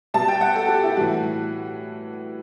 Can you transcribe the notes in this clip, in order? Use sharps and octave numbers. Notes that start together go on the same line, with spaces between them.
B2 G3 A5
G5
F#5
A4
G4
E4
A2 E3 G3 F#4